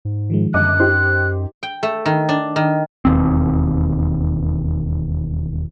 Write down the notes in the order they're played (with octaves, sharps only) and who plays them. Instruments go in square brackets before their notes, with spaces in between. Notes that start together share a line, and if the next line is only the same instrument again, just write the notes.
[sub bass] G#2
[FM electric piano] D#3 F3 G#3
[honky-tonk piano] G1 D#5 D6 [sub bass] F#2 [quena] F#6
[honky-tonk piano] D#4 G4 [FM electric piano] C5 C6
[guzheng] G5
A3
D#3
D4
D#3
[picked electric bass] E1 D#2 C4